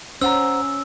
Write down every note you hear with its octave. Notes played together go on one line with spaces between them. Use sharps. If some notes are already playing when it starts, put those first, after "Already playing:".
C#4 C5 F#5 A#5 E6